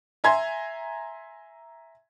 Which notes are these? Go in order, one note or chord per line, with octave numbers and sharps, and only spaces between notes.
E5 G#5 A#5 C6 G#6